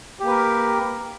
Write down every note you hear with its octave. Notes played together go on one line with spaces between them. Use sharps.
A#3 G4 A#4 B4